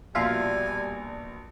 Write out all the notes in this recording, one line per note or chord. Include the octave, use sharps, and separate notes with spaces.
A#1 B2 G3 F4 E5 F5 G#5